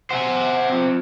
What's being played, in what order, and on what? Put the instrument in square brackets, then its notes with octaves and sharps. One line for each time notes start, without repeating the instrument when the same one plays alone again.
[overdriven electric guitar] C5 E5 [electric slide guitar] F#5 G#5
[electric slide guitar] C4 F4